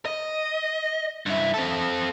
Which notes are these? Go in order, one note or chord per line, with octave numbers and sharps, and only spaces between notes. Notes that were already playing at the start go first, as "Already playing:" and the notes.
D#5
G2 E4
C4 A4